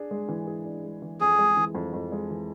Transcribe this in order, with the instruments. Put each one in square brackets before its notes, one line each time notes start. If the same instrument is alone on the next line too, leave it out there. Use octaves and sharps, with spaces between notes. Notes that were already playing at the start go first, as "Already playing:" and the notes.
Already playing: [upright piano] D4 G#4
G#3
E3
G#4
D4
G#3
E3
[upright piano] F2 [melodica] G#4
[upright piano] G#3
E3
F2
F2
G#3
E3